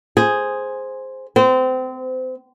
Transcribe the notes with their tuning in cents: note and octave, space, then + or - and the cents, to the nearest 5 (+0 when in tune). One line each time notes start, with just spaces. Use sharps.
G#4 +0 C5 +0
C4 -30 C5 -25